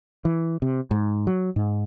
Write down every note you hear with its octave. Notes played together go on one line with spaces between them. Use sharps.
E3
C3
G#2
F#3
G#2